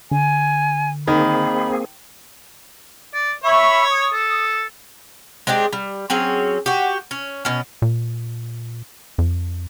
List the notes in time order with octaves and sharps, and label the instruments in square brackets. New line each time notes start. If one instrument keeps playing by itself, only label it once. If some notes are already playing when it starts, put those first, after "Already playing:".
[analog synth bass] D3 [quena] G#5
[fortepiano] D#3 [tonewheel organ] A#3 C4 G#4 [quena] B5
[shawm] D5
[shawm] C#5 [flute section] E5 B5 C#6
[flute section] D#6
[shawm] A4
[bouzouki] G#3 C4 D4 G4
G3
F#3 C4 C#4 G#4
F#4 G4
C#4
B2 C#4
[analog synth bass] A#2
F2